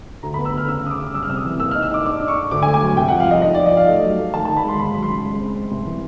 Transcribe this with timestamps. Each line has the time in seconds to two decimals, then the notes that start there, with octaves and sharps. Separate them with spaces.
0.23 D2 A#5
0.34 B5
0.38 B3
0.45 E6
0.53 D2 F6
0.68 C#3 E6
0.84 C#3 D#6
0.91 D6
0.99 C#3
1.14 G3 E6
1.22 F6
1.29 C3 E6
1.37 D#6
1.45 E3
1.60 A#3 E6
1.71 F6
1.75 D#4
1.83 E6
1.90 D#4 D6
2.06 D4 D6
2.20 D4
2.28 C#6
2.36 D4
2.51 D2 D6
2.63 G#5
2.67 A3
2.74 G#5
2.81 F#3
2.97 C2 G5
3.08 F#5
3.12 F3
3.20 F5
3.27 F3 D#5
3.42 D#4 D#5
3.55 D5
3.58 F3
3.66 D#5
3.73 D#4 F5
3.88 A3
4.03 F#3
4.19 A3
4.34 D#3 A5
4.45 A5
4.49 D#3
4.57 B5
4.65 G#3 C6
4.79 D#2 B5
4.95 F#3
5.03 C6
5.10 C#3
5.25 G#3
5.40 C4
5.56 C4
5.71 C2
5.86 E3